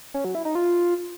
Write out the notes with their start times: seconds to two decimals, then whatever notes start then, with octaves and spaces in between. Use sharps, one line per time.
0.14 C#4
0.25 F#3
0.35 E4
0.45 D#4
0.55 F4